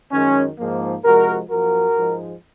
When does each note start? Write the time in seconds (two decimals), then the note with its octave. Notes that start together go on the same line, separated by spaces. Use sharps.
0.12 F#2 D#3 G#3 C#4
0.59 G#2 F3 A#3
1.04 C3 F3 G#3 F#4 A#4
1.50 F#2 F3 A#3 F#4 A#4
1.96 G#2 F3 G#3